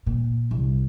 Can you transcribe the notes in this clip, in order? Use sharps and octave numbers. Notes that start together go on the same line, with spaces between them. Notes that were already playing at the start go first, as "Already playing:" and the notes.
A#2
C2